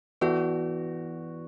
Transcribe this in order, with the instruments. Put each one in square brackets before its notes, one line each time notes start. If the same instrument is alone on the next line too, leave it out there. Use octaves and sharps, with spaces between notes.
[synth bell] E3 B3 E4 B4 D5 [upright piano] F#4